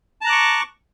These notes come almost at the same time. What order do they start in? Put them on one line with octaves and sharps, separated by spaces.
A5 A#5 F#6 D6 C#6